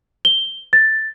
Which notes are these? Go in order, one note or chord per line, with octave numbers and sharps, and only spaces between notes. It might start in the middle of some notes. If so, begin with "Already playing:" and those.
G7
A6